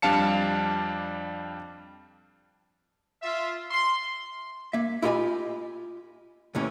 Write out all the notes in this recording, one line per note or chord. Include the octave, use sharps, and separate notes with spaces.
F2 G3 D4 F5 A5 C#7
F4 E5
C6
A#3 E5
E4 F4 G4 D#5 G#5 B5
D#2 A2 C3 E3 C#4